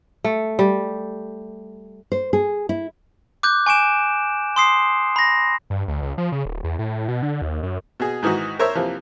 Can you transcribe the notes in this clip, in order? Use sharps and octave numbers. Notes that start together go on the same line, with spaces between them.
A3
G3
C5
G#4
E4
D6 F#6 G6
G#5 C#6 D7 E7
C6 D#6 C7
B5 A#6
G2
D2
C#2
F3
C#3
D1
E2
A2
B2
D3
D#2
F#2
B2 G#4
G#2 D#3 E3 D#4 F#4
A#4 C5 C#5 E5
C3 E3 F3 A#3